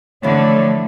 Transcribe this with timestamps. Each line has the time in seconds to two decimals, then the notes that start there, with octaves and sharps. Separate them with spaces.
0.23 D3 E3 F3 A3 D4 C#5